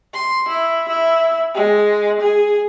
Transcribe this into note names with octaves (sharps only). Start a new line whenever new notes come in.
C6
E4
E4
G#3
G#4